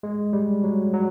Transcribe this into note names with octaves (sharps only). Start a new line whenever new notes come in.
G#3
G3
F#3
F#3